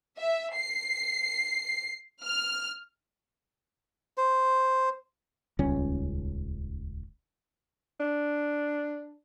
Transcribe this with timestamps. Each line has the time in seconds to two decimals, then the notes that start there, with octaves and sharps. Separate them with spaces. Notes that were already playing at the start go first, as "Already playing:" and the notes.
0.18 E5
0.56 C7
2.22 F6
4.17 C5
5.59 D#1 C#2 G3 C#4
8.00 D4